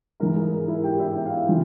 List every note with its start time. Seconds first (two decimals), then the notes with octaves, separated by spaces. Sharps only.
0.20 G#2 E3 A#4
0.36 G#4
0.52 A#4
0.68 E4 E5
0.84 G4 G5
0.99 E4 E5
1.16 G5
1.26 F5
1.36 E5
1.47 C#3 E3 F4 F5